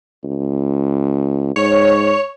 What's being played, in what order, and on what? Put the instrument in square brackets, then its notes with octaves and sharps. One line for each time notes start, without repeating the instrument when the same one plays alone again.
[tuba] C#2
[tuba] G#2 [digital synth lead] C#5